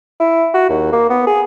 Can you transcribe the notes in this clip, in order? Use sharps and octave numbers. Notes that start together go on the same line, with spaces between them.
E4
F#4
D#2
A#3
B3
G#4